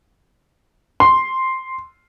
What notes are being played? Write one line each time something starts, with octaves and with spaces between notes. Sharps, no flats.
C6